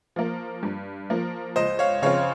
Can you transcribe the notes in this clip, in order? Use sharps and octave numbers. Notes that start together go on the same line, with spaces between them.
F3 A#3
G2
F3 A#3
C#2 C5 D#5
C#5 F5
C#3 F3 C4 F4 C#5 F5